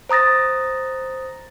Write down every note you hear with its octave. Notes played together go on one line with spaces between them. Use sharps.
C5 A#5 D#6 A6 A#6